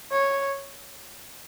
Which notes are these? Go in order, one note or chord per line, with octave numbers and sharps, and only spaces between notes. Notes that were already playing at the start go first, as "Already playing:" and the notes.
C#5